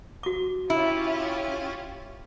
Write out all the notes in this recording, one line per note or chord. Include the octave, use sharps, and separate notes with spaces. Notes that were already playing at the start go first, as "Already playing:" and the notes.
F#4 D6
C#4 E4 F4 G4